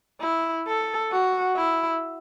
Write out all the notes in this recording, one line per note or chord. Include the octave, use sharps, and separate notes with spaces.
E4
A4
F#4
E4